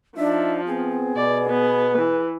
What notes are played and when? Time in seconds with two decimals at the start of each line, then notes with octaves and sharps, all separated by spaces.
0.17 F3 D4 D#4 E5
0.66 B3 C4 G#4
1.16 B2 D5
1.49 B3 B4
1.98 E3